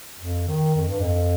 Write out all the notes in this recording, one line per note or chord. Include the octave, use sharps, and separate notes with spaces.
F2
D#3
F2
G2
F2